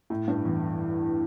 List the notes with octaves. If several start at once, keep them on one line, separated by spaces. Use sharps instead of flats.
A2
G2
E2